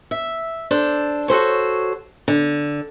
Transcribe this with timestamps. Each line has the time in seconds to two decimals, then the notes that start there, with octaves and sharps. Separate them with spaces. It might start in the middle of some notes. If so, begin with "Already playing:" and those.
0.11 E5
0.71 D4 A4 C5
1.28 F#4 A4 C5 C#5
2.28 D3